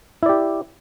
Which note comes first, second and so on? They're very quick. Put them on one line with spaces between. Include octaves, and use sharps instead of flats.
E4 D5 G4